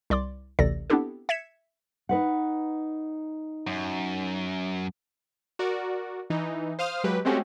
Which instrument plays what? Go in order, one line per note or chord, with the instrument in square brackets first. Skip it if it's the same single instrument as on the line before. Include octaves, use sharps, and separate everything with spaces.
[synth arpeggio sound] C2 D5 C6 D6
A1 D2 C3 A4 D5 A#6
B3 C4 D4 E4 G4 A4
E5 G#6 B6 C#7 E7
[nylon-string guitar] D#4 B4 F#5
[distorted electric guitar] F#2
[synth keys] F#4 A#4 D5
E3 D#4
C5 F5 D#6 F6
F#3 G#3 G4 B4
G#3 A3 C4 C#4 F#4 G4